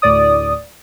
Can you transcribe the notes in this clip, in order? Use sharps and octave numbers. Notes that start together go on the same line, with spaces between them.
D2 A2 D5 D#6